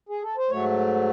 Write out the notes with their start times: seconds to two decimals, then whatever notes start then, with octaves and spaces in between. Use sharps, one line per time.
0.09 G#4
0.22 A4
0.37 C5
0.50 G#2 F#3 A3 C#5